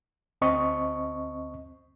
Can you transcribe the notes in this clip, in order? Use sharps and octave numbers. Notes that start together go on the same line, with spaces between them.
D2 C4 D#5 C#6